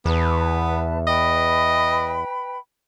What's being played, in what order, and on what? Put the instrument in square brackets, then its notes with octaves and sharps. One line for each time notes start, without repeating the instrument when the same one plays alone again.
[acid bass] E2 [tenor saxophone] B3 [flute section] B4 A5
[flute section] B4 G5 B5 [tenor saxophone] D#5